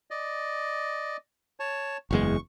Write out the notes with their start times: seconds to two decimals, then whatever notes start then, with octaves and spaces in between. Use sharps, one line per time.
0.11 D5 D#5
1.60 C#5 A5
2.11 F#1 E2 G#3 C#6